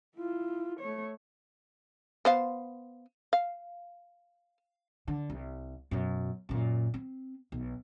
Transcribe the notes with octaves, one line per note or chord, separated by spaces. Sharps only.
E4 F4
A3 C#5
B3 C5 F5
F5
D3
C2
F#2 B2
F#2 A#2
C4
B1